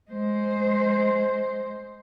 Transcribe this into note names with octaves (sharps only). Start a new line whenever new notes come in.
G#3 C5